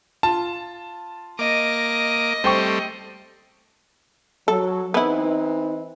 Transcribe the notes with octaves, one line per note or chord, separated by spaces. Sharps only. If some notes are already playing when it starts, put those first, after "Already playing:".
F4 A5
A#3 D#5 D6
G3 A3 C4 C5 G5 C#6
F#3 A4
E3 B3 C4 D#4 E4